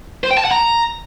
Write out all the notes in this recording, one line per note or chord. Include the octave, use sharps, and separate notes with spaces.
C5
G5
A5
F#5
A#5